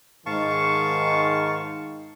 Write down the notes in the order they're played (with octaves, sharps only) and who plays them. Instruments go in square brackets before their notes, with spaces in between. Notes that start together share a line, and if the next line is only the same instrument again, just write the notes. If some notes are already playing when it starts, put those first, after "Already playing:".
[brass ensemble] G#2 D#3 [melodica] F5 A5 C#6